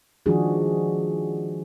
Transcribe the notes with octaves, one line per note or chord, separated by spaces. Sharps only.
D#3 F3 G#3 D4 F#4 G#4